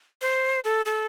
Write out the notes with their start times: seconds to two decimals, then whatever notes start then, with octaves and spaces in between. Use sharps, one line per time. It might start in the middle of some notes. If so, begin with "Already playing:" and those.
0.21 C5
0.64 A4
0.86 A4